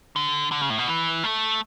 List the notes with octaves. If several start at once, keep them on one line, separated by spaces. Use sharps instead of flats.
D3
D3
C#3
A2
B2
E3
A3